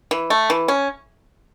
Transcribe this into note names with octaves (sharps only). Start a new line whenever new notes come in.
E3
A3
E3
C#4